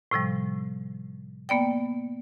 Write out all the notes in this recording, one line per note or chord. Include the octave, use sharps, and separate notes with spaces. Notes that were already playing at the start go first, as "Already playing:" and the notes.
A2 C3 F3 G3
A#3 B3 D5 G5